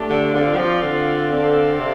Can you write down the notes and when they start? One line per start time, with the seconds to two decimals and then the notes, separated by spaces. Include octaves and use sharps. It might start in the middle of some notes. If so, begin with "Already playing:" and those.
Already playing: A3 D4 G4
0.10 D3
0.34 D3 C4 F4 D5 F5
0.54 G3
0.58 F3
0.83 D3
1.30 C4 A4 D5 F5
1.79 C3